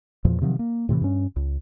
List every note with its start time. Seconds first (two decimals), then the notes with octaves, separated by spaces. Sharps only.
0.25 E2 A#2 F3
0.42 C3 D#3 F3 F#3
0.59 A#3
0.89 A2 C3 D#3 E3
1.01 G2 C#4
1.36 C#2